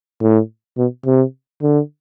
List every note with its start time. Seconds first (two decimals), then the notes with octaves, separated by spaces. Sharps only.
0.22 A2
0.77 B2
1.06 C3
1.62 D3